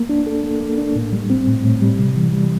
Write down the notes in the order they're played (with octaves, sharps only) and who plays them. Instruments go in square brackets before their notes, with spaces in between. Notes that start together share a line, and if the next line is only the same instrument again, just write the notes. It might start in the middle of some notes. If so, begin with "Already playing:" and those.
Already playing: [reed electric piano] A#3
D4
A4
A#3
A#3
D4
A2
G3
C4
A2
A2
G3
C3
E3
G3